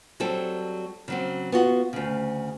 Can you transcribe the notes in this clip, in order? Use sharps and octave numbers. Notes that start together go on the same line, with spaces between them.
F#3 G3 C4 A4
C#3 F#3 C4
B3 F4 F#4
D2 C#3